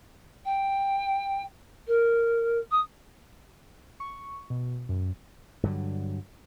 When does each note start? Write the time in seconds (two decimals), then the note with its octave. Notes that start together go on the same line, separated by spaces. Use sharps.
0.45 G5
1.87 A#4
2.71 D#6
4.00 C#6
4.50 B2
4.89 F#2
5.63 G2 D3 F#3